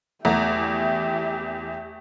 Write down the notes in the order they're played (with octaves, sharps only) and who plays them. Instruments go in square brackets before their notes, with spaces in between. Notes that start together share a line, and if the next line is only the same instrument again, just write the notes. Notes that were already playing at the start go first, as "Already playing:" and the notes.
[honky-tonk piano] E2 [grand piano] A3 F#5 A#5 [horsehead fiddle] G4 E5